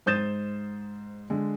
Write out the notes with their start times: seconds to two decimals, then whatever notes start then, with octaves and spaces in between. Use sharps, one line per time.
0.06 G#2 C5 D#6 G6 A6 E7
1.30 D3 G#3